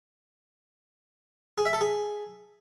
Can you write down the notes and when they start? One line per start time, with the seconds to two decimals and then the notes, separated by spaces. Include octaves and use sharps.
1.58 G#4
1.65 E5
1.73 A4
1.81 G#4